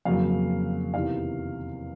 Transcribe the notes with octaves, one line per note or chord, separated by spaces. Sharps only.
F2 C#3 F#3 A#3 F5
E2 C3 D#3 F5